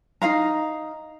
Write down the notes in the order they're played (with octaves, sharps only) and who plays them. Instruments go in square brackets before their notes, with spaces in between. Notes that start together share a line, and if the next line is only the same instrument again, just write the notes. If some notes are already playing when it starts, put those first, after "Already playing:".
[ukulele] D#4 G#4 F5 A#5